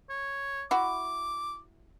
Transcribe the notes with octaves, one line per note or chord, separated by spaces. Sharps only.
C#5
E4 F#4 D6